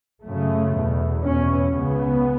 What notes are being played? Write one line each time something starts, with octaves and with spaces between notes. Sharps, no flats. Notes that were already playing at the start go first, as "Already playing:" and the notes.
F#2 C#3 A3
E2 B2
E2 B2 C#4
C#2 C#3 B3